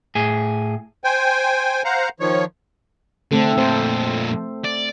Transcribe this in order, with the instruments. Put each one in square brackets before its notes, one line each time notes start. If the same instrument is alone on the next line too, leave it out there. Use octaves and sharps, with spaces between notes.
[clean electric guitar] A2 G#4
[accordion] C5 G5 G#5
C5 F5 F#5 A#5
D#3 F3 C#5
[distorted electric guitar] D3 [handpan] A3 C4 A4
[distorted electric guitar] F2 A#2 [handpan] C5
[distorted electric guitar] D5